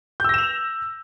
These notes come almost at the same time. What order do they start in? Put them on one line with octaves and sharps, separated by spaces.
G6 E6 A#6 E7 F7